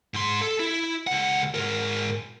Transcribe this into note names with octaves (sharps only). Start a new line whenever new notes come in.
G#2 C6
A4
E4
C#2 F#5
G#2 A#4